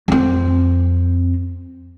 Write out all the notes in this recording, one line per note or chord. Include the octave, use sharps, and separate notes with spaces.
F2 C4